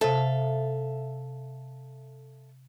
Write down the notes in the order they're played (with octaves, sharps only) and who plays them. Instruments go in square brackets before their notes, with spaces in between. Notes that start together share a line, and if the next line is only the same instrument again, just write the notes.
[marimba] C3 A5 [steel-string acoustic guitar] A4 E5 F5